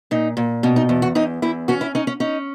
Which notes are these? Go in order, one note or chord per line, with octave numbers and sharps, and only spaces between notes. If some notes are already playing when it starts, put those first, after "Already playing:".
A#2 D#4
A#2
B2 C#4
D#4
E2
F#4
E2 D#4
E2 E4
C#4 F#4
E4
C#4 D#4
C#4
C#4 D#4